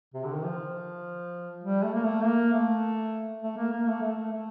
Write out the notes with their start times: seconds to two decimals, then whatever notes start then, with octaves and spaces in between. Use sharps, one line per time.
0.14 C3
0.24 D3
0.34 D#3
0.44 F3
1.64 G3
1.83 A3
1.94 A#3
2.03 A3
2.23 A#3
2.53 A3
3.42 A3
3.57 A#3
3.72 A#3
3.87 A3
4.02 A3
4.32 A3